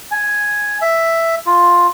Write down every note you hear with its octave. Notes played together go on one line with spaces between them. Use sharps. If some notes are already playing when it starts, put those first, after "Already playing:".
G#5
E5
F4